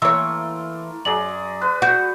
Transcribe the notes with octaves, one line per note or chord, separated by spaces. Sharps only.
E3 A3 A#3 C#5 C6 E6
F#2 F#3 G#4 D5 F#7
B4 F#6
F#4 F#5 G6